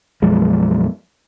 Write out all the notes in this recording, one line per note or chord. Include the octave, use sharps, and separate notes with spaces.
B1 F#2 F3 G#3